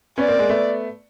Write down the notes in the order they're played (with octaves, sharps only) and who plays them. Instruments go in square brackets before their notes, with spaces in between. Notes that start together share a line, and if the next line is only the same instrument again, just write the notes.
[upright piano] B3 C#4 [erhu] D5
[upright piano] A#3 C4
G#3 A#3
A3 B3